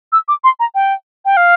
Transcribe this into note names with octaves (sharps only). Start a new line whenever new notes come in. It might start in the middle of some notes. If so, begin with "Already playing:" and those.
E6
D6
C6
A#5
G5
G5
F5